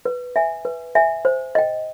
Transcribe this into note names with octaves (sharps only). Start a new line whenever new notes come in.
B4
E5 G#5
B4
E5 G#5
C5
D#5 G5